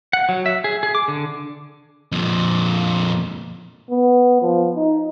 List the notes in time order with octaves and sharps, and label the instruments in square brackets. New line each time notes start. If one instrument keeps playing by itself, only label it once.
[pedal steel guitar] F#5
F#3
E5
G#4
G#4
D6
D3
[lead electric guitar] F2 A#2
[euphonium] B3
F3
D#4